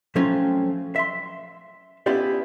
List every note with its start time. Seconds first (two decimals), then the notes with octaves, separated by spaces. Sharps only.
0.15 F3 F#3 A3 C4 C#4 F4
0.96 E5 C6
2.06 B3 C#4 E4 F4 G4 D5